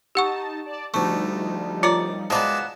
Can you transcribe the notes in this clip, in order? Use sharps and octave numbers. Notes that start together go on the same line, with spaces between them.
D#4 G4 F#5 A5 C#6
D5 A5
D2 F3 G3 A3 D#4 C#6
F4 A#4 C#5 D5
F3 F#3 G#3 B3 D5 E7